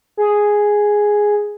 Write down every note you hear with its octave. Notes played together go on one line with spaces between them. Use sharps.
G#4